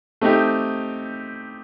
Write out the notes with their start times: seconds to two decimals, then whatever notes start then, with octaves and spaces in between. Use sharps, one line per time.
0.21 A3 C4 D#4 G4